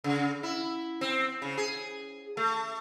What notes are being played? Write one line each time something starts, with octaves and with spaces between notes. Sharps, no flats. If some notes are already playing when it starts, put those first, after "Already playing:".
C#3
E4
C4
C#3
G#4
A3